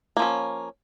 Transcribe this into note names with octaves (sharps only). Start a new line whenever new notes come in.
F3 A#3 C#4